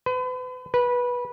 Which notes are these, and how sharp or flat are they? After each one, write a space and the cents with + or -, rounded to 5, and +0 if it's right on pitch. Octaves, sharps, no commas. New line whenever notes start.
B4 +40
B4 -15